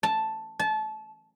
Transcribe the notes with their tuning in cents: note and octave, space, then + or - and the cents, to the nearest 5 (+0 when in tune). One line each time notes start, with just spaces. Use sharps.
A5 +0
A5 -25